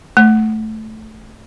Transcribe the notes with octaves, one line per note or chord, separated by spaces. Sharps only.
A3